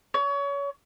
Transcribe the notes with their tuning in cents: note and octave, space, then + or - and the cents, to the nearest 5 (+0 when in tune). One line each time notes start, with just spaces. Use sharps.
C#5 +30